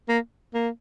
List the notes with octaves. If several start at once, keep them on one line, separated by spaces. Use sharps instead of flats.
A#3
A#3